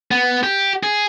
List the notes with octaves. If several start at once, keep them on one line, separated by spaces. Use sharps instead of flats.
B3
G4
G#4